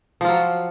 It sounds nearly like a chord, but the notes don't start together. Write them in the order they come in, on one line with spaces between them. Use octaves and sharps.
F3 F4 F#3